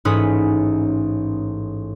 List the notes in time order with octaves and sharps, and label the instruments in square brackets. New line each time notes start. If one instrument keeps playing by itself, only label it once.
[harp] A1 G#2 C#4 B4 D#6 B6